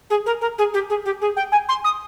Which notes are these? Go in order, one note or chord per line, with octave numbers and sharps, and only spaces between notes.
G#4
A#4
A#4
G#4
G4
G#4
G4
G#4
G5
G#5
C6
D#6